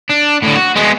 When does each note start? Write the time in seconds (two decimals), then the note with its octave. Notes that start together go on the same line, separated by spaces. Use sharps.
0.09 D4
0.42 A2 D3
0.55 F#4
0.75 G#3 B3